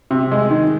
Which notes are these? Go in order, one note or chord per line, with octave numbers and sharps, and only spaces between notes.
C3
G#3
D#3